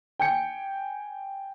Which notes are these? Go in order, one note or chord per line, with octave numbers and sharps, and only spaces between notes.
G5 G#5 G6 C#7